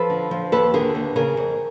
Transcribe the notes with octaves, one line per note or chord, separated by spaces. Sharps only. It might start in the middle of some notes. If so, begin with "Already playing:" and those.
Already playing: F3 A4 B4
D3
F3
D#2 A4 B4
D3 G#4 A#4
D#2
C#3 G#4 A#4
F2